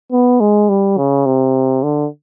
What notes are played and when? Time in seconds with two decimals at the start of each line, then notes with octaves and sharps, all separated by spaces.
0.12 B3
0.40 G#3
0.69 G3
0.98 C#3
1.26 C3
1.83 D3